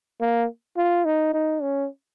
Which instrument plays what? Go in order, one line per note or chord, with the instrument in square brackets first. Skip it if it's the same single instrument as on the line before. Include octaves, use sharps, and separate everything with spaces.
[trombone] A#3
F4
D#4
D#4
C#4